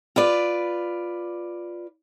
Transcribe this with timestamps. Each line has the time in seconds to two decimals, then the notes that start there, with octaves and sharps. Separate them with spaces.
0.16 F4 B4 D5